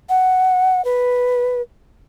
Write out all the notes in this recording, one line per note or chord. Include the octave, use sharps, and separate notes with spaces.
F#5
B4